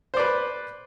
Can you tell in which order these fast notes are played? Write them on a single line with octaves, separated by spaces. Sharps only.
C5 D5 B4